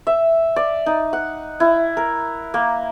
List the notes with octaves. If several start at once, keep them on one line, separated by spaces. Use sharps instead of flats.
E5
D5
D#4
F#5
E4
A#4
A#3